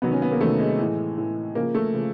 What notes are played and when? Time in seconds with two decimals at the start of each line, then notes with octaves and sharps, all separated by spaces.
0.02 C3 D#3 F#3 B3
0.12 C#4
0.22 B3
0.31 A#3
0.41 C3 D#3 F#3 A3
0.60 G#3
0.78 A2 E3
1.18 A2 E3
1.55 C#3 F3 A#3
1.75 A3
1.94 C#3 F3